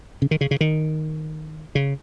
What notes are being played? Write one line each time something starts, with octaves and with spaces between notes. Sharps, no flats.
C#3
D#3
C#3
C#3
D#3
C#3